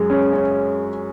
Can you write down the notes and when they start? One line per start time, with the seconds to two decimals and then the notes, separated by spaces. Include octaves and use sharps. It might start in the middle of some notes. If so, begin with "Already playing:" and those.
Already playing: F#2 G#3
0.10 C#4
0.33 C#4